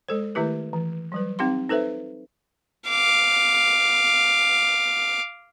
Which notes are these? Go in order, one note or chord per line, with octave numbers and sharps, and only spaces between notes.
G#3 A4 C5
D#3 A3 E4 G4 B4
E3
F#3 G3 B4
C4 D#4 G4 F5 C6
D#4 A4 B4 C5 E5
F5 D6